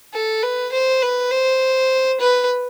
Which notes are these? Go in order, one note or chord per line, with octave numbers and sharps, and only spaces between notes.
A4
B4
C5
B4
C5
B4